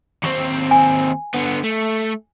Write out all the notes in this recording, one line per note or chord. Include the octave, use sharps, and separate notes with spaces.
D#2 C4 C#6
G#5
D3 B3
A3